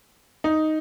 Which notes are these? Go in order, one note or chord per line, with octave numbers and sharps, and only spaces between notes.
D#4